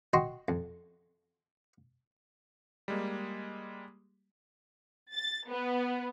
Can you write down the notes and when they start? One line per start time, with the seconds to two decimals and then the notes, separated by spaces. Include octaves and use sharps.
0.13 F#4 D#5 G5 C6 C#6
0.48 F2
2.88 G3 G#3 A#3
5.12 A6
5.48 B3